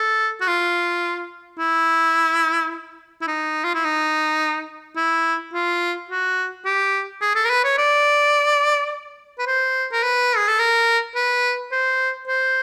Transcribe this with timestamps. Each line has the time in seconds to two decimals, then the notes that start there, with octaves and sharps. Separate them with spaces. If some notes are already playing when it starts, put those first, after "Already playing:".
Already playing: A4
0.41 F#4
0.47 F4
1.59 E4
3.21 E4
3.27 D#4
3.64 F4
3.74 E4
3.85 D#4
4.96 E4
5.54 F4
6.09 F#4
6.65 G4
7.22 G#4
7.35 A4
7.45 A#4
7.50 B4
7.64 C#5
7.78 D5
9.39 B4
9.47 C5
9.92 A#4
10.03 B4
10.37 G#4
10.48 A4
10.59 A#4
11.15 B4
11.72 C5
12.28 C5